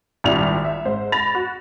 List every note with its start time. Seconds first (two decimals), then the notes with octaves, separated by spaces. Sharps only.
0.24 G#1 G2 A#2 G3 E4 F7
0.65 E5
0.85 G#2 C5
1.12 B5 A6 A#6 F7
1.35 F#4